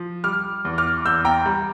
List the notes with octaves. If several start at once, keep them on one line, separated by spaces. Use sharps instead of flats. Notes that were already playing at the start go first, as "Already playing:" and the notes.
Already playing: F3
G3 D6 F6
E2
D6 F6
E2 E6 G6
G5 A#5
G3